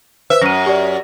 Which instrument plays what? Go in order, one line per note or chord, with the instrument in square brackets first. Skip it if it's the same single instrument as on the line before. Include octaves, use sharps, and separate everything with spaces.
[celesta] B4 C5 [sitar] E5
[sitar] F#2 [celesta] A#6 D#7
[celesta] G4 D5